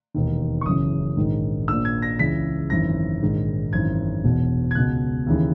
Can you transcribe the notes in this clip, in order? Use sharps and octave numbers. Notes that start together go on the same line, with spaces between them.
E1 D#2 D#3
C#6
F#1 F#2 C#3 E3 D#6
A#1 G#2 D#3
A#1 A#2 E6
G#6
A#6
C#2 C#3 E3 B6
G#1 F#2 E3 A#6
A#1 G#2 D#3
G#1 F#2 E3 G#6
E1 E2 B2
G#6
C#2 B2 F#6
D#2 C#3 E3